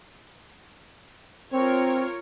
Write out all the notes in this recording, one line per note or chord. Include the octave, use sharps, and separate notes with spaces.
C4 F4 A#4 C#5